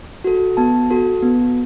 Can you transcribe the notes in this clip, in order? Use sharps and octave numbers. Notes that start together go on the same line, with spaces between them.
F#4 A4
B3 A5
F#4 A4
B3